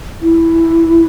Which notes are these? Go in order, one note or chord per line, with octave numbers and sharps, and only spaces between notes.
E4